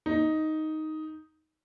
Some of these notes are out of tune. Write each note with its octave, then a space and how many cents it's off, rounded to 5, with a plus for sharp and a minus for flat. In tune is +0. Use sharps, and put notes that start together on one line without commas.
D#4 +5